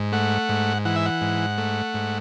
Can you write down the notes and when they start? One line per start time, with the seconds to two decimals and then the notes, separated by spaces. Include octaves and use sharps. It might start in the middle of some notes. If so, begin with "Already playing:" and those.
Already playing: G#2
0.12 A3 F#5
0.49 G#2
0.85 E3 F#5
0.96 E5
1.06 F#5
1.21 G#2
1.58 A3
1.94 G#2